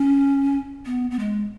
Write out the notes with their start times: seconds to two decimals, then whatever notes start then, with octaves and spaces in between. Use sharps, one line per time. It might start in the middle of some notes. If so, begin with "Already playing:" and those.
Already playing: C#4
0.86 B3
1.11 B3
1.19 G#3